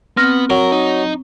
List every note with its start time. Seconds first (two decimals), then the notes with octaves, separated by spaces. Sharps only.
0.17 B3 C4 F6 A#6
0.50 F#3 A#4
0.72 D#4